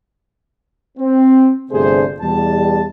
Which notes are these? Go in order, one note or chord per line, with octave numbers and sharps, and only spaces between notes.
C4
G1 C3 A3 D4 G#4 C5
E2 B2 G3 A5